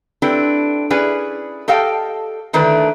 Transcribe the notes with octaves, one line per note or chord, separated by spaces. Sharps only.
C4 D4 E4 G4 A4 B4
C#4 E4 G#4 B4 D5
G4 A4 D#5 F5 G5 A5
D3 D#3 A3 D4 E4 B4